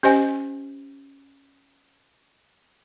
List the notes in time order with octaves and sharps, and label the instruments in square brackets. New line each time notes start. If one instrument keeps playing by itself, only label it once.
[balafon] C#4 G4 C5 D#5 G#5